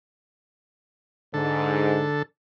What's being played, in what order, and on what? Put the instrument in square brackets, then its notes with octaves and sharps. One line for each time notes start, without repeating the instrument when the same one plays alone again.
[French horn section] G#2 [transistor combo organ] D3 A4